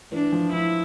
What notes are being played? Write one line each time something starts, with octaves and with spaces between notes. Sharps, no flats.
E3 D4
F3
F3 E4